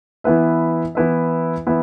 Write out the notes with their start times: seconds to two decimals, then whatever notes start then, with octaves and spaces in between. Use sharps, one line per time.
0.24 E3 B3 E4 B4 E5
0.95 E3 B3 E4 B4 E5
1.67 E3 B3 E4 B4 E5